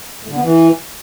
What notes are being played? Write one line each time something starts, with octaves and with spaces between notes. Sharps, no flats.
A2
D3
B3
E3